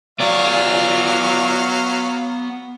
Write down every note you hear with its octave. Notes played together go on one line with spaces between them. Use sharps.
F#3 B3 D5 F5